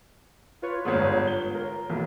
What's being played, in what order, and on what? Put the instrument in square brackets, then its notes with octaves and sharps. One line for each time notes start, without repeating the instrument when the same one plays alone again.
[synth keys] F4 B4 C#5
[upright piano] G1 E2 G#2
G7
A#4
[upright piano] B1 [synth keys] E3